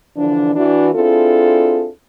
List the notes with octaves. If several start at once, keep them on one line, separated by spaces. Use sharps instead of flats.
D3 E3 F3 D4
E3 D4 F#4
C4 D4 E4 F4 G#4 A4